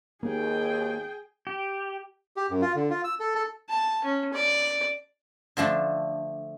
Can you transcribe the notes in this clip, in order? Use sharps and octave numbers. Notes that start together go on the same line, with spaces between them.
G#1 D#2 A#3 G#4 G5
G4
G4
F#2
F4
D3
F4
E6
A4
A4
A5
C#4
D5
D3 F3 A3 D4